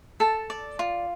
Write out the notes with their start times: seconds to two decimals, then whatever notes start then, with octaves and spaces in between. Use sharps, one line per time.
0.20 A4 A5
0.50 D5
0.79 F4